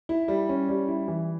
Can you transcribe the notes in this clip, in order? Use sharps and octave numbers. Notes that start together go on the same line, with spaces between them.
E4
G3
C#4
G3
E4
E3